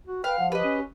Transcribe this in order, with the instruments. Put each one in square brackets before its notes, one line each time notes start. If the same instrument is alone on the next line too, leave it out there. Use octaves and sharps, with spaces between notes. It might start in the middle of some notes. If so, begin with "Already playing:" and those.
[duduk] F#4
[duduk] B4 [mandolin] F5 [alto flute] G5
[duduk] F3 [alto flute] F#5
[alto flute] G4 [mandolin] B4 D#5
[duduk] C#4